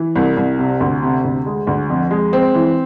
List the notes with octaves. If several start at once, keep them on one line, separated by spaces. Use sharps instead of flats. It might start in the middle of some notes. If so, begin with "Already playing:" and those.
Already playing: E3
C2
C2
C3
D2
C3
D2
G#3
D2
F2
G#3
C4
E3